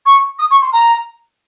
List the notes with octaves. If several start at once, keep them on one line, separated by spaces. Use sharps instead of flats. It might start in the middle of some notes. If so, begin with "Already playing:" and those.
C#6
D#6
C#6
C6
A#5